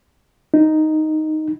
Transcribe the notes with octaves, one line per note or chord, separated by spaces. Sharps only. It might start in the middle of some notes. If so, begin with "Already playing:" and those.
D#4